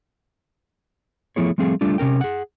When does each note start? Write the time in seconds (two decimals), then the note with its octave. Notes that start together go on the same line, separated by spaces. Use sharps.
1.36 F3 A3 B3 E4 G#4 C#5
1.58 F3 G3 A3 C4 G#4 F5
1.81 G3 A3 D4 F4
1.98 C3 C#4 A#4 G5
2.21 G#4 F#5